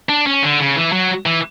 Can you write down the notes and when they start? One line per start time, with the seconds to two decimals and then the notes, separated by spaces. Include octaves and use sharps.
0.09 D4
0.27 C#4
0.43 D3
0.60 C#3
0.76 E3
0.92 F#3
1.26 E3